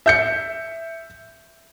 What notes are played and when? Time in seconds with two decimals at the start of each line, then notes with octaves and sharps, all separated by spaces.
0.06 E5 G6 C#7